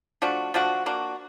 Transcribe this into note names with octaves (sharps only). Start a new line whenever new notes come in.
F3 A3 D4 F#4
F3 A3 D4 F#4
A#3 D4 F#4